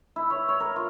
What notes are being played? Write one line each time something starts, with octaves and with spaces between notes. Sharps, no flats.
E4
C#5
C#5
A#4
F4